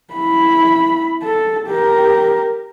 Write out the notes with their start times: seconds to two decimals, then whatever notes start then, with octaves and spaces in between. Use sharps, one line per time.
0.14 E4 B5
1.22 A4
1.68 G4 A#4